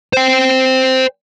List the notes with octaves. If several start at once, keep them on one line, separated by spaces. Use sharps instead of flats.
C5 G5